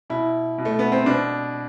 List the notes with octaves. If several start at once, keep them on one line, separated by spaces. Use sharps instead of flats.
B2 E4
B2
A3
B3
C4
B2 D4